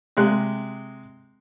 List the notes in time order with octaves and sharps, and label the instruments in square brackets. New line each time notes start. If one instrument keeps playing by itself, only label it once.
[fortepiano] C3 G#3 F#6